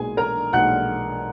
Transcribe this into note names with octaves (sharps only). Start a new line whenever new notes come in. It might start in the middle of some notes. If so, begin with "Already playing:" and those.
Already playing: B1 A#2 G#3 B3 G#4 G#5
A#4 A#5
B1 A#2 G#3 B3 F#5 F#6